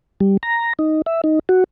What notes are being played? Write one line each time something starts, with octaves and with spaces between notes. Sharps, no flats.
G3
A#5
D#4
E5
D#4
F#4